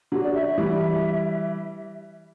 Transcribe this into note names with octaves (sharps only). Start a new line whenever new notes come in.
D3 F#3 G4
D5
E5
E5
E3 G3